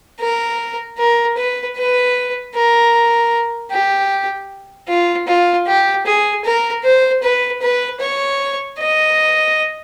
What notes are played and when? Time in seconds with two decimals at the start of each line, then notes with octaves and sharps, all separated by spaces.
0.20 A#4
0.98 A#4
1.37 B4
1.77 B4
2.54 A#4
3.71 G4
4.88 F4
5.28 F4
5.67 G4
6.06 G#4
6.44 A#4
6.84 C5
7.23 B4
7.62 B4
8.01 C#5
8.79 D#5